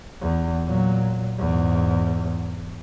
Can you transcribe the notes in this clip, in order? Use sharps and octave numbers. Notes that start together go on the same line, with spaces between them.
E2
A#2 F#3
E2 G#2